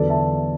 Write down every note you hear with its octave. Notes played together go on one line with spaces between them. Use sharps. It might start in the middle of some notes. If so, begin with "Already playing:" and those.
Already playing: E2 D3 F#3 A4 D5
E5 A5